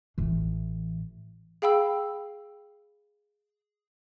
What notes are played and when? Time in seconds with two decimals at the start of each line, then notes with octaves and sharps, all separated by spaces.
0.18 A1 E3
1.62 G#4 F5 G5 B5 E6